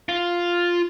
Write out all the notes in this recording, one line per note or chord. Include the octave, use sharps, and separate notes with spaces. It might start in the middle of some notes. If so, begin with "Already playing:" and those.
F4